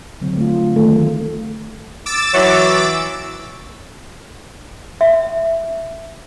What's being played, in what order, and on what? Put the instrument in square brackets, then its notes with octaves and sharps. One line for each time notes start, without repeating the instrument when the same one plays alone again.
[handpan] D3 F#3 C4
A3 F4
[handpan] D#3 [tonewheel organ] A3
[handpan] F#3
[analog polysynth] D6 E6 A6
[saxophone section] E3 F#3
[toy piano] E5